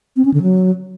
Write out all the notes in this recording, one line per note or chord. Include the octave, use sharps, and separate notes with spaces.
C4
C#4
D3
F#3